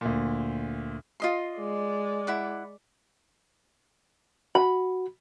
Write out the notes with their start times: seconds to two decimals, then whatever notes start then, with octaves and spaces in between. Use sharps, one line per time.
0.01 D2 A#2
1.20 F4 D#5 C6
1.55 G#3 D5
2.27 E4 F#5 D6
4.55 F#4 B5